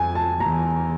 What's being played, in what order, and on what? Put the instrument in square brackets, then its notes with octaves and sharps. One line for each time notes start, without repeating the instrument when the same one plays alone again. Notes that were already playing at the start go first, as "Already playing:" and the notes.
Already playing: [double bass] F2 [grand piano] G#5
[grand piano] A5
[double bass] E2 [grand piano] A#5